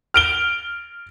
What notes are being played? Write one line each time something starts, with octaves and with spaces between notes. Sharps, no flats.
F6 D7 G7